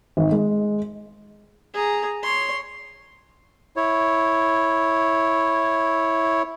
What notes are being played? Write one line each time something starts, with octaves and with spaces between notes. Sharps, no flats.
G#1
G#3
G#4 A#5
C#5 C6
E4 C#5